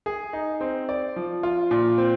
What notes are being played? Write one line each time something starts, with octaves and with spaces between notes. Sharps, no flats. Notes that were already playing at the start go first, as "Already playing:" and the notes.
G#4
D#4
C4
D5
F3
F4
A#2
C4